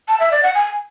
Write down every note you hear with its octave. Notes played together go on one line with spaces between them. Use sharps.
A5
E5
D5
F#5
G#5